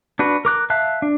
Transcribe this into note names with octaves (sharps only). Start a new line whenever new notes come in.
D4 F#4 B4
A#4 D6 F#6
E5 F5 A5 F#6
D4